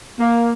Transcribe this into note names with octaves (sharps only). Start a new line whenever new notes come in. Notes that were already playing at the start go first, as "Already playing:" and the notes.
A#3